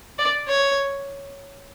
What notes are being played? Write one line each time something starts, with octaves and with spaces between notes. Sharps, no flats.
D5
C#5